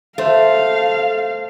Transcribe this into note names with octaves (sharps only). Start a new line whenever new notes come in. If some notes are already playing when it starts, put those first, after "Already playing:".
A3 A4 C5 F5